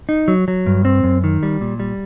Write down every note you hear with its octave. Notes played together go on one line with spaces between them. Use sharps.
D#4
F#3
F#3
G2
C4
F#2
D#3
G3
A#2
G3